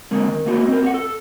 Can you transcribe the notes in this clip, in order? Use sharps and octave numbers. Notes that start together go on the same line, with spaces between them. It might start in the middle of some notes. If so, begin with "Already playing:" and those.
D3 G#3 A#3 C4
D#3
A3 A#3 D#4 F#4 G4
C4 A#4
G4 F5 F#5
A4